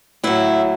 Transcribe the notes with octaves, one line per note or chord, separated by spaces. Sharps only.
A2 F#3 E4